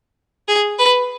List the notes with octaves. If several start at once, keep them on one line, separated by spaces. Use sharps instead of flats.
G#4
B4